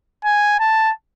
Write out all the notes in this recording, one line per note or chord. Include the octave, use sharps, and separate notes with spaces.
G#5
A5